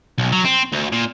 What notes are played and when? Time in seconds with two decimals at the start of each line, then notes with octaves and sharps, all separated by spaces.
0.18 B1
0.32 F#3
0.45 C4
0.73 D2
0.93 A#2